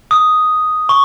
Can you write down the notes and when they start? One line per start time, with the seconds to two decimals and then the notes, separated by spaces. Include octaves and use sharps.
0.11 D#6
0.89 C#6